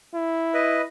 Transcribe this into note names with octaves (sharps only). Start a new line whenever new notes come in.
E4
B4 D#5